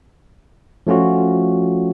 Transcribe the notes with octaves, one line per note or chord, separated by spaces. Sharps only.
F3 A3 C#4 F4 F#4